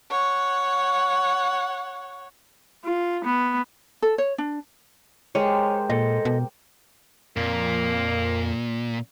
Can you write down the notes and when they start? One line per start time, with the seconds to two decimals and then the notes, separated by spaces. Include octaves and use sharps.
0.10 C#5 F#5
2.84 F4
3.25 B3
4.02 A4
4.18 C#5
4.38 D4
5.35 G#3 G4 A#4 C5 C#5
5.90 A#2 A4 D#5
6.25 B2
7.37 F2 A#2 A#3